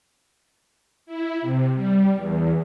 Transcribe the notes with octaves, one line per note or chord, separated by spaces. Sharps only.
E4
C3
G3
E2